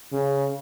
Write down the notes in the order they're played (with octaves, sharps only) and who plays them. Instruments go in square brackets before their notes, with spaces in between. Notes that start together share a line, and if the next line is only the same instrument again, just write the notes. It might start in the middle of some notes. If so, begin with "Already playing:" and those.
[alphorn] C#3